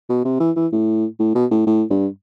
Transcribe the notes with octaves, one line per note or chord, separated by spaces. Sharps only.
B2
C3
E3
E3
A2
A2
B2
A2
A2
G2